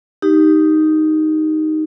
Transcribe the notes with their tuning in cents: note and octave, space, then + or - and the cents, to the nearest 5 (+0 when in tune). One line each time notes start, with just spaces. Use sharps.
D#4 +0 G4 -5